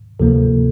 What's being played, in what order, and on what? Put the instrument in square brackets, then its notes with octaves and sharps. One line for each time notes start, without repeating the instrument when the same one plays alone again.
[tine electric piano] D2 C3 F3 A#3 A4